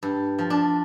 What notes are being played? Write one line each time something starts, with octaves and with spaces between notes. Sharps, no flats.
G2
F3
D4